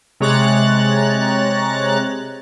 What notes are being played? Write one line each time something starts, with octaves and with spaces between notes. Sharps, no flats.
C3 G#3 C#5 A#5 F#6 A6